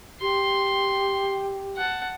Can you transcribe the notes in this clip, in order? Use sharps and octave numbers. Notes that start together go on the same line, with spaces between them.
G4 C6
F#5 A5